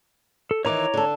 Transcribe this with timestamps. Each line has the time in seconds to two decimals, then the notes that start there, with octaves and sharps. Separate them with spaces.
0.51 A4
0.65 D#3 E3 D#4 C#5 A#5 D6
0.94 D3 A4